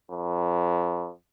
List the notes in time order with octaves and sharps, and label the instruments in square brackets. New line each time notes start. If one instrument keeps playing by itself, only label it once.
[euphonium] F2